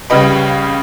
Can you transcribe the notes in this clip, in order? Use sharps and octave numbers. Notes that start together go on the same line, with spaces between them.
C#2 C#3 G3 B4 D#5